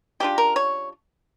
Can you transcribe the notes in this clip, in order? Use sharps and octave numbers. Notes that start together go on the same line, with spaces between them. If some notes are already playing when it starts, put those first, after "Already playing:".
C#3 G3 D4 F4 G4
A#4
C#5